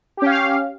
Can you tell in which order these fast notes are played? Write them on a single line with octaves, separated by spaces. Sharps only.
G4 C#4 F5